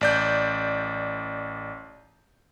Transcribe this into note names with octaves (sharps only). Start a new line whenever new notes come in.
A1 D5 G6